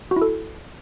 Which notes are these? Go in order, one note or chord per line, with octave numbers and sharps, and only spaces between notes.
F#4
E4
A4